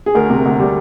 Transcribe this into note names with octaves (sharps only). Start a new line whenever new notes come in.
G#4
D2 A#4
C3
D2
G3